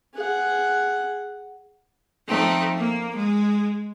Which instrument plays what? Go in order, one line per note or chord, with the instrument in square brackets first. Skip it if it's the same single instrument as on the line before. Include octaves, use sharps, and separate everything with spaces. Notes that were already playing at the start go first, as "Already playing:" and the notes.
[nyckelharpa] G#4 F#5
[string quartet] F3 A3 C4 D#4
A#3
G#3